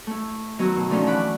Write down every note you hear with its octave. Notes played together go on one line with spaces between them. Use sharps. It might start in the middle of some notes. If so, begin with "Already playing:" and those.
A3 E4
D#3 F#3 B3 E4 F#4
B2
D3 E3 F3 A3 C#4 D#4
F#5 B5 D6 F#6